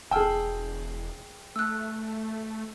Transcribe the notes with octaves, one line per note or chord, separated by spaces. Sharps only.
E1 G#4 G5 A5 E6 F6
A3 E6 F#6